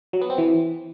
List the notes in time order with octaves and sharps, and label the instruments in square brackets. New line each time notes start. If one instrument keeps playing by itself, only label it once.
[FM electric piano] F#3
B3
C4
E3